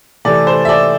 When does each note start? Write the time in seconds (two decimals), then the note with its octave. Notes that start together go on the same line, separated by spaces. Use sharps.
0.25 C3 E3 A3 D5
0.47 C5
0.65 E5
0.69 D5